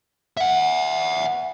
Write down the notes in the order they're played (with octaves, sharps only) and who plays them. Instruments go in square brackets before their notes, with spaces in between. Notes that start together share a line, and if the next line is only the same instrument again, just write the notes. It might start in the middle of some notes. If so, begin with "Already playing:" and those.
[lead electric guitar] E5 F#5